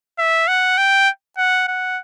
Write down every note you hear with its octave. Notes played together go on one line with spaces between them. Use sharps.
E5
F#5
G5
F#5
F#5